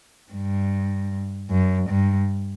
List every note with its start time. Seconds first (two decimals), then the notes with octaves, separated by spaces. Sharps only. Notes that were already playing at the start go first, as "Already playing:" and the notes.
0.33 G2
1.50 F#2
1.89 G2